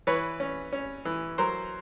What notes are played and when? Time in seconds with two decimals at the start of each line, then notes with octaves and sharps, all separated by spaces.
0.07 E3 B4 C#5
0.40 C#4
0.73 C#4
1.05 E3
1.38 F#3 A#4 C5